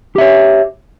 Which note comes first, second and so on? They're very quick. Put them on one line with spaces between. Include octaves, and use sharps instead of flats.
G4 E5 C#5